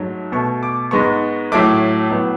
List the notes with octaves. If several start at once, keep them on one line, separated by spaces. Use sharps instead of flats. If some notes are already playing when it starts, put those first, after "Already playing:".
Already playing: G#2 F#3 A3
B2 A3 C#6
D6
G#2 G#3 B3 C#6
A2 F#3 A3 D6
A2 F#3 B3